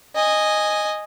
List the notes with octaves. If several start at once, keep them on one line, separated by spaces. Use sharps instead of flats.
D#5 G#5